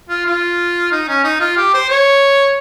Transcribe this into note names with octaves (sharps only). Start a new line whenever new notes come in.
F4
F4
D#4
C#4
D#4
F4
G4
C5
C#5